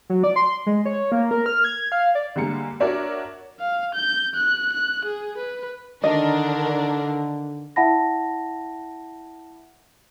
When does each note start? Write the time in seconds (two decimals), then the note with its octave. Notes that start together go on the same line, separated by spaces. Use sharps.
0.10 F#3
0.24 D5
0.36 C6
0.66 G#3
0.86 C#5
1.12 A#3
1.31 A#4
1.46 F6
1.64 G#6
1.92 F5
2.15 D5
2.36 D3 G3 G#3 A#3 C#7
2.80 D4 F#4 A#4 C#5 D5 E5
3.60 F5
3.95 G6
4.35 F#6
4.73 F#6
5.05 G#4
5.38 B4
6.04 D3 D#3 D4 A#4 D#5
7.76 E4 E5 F#5 A5 B5 A#6